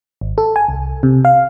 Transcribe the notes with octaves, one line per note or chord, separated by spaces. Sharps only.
G#1
A4
G#5
C2
C3
F5